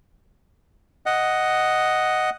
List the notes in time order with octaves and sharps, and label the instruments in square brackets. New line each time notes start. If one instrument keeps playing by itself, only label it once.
[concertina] D#5 F#5